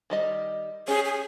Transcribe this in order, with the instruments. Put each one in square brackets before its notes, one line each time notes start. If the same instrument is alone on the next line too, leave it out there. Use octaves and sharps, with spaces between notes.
[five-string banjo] D#3 G3 D#5
[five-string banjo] C#4 G4 [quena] G#4
[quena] G#4